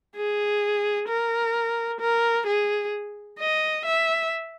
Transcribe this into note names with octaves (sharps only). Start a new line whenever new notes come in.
G#4
A#4
A#4
G#4
D#5
E5